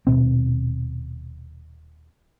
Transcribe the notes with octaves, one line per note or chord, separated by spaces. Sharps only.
D#1 C2 B2 C4